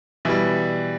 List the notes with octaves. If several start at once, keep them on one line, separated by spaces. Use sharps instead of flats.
B2 E3 G3 E4